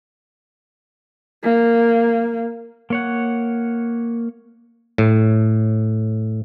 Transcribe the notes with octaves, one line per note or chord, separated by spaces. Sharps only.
A#3
A#3 C#5 F#5
A2